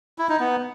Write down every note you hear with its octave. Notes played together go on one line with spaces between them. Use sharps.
E4
D#4
B3